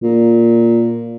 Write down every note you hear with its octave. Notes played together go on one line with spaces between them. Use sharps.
A#2